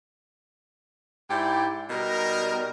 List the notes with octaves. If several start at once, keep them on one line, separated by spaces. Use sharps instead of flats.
G#2 E4 G4 D5 G5
B2 G3 D#4 A#4